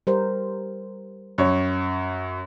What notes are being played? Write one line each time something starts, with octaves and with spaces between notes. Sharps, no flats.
G3 A#4 C5
F#2 C#5